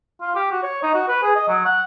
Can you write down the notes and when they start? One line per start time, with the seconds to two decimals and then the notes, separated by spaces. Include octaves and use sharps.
0.21 F4
0.35 G4
0.51 F#4
0.63 C#5
0.83 D#4
0.94 F#4
1.08 B4
1.22 G#4
1.35 D#5
1.48 F#3
1.65 F#5